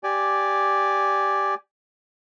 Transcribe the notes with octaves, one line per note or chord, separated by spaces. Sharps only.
G4 D5 G#5